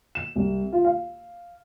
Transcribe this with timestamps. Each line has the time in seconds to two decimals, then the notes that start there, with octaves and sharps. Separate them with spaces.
0.15 E7
0.36 C2
0.72 F4
0.85 F5